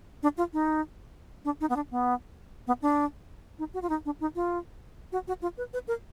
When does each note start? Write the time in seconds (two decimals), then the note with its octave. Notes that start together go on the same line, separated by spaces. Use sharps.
0.23 D4
0.37 F4
0.53 D#4
1.45 D4
1.61 D#4
1.69 B3
1.76 D4
1.91 B3
2.67 B3
2.82 D4
3.59 D#4
3.74 F#4
3.82 F4
3.89 D#4
4.05 D4
4.20 D#4
4.35 F4
5.12 F#4
5.28 F#4
5.42 F4
5.58 B4
5.73 B4
5.88 A#4